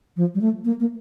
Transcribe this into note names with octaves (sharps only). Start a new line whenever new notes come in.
F3
G3
A3
A#3
A#3